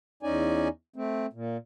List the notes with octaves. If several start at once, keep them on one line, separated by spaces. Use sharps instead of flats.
E2 C#4 D#4 D5 G#5
A3 C4
A#2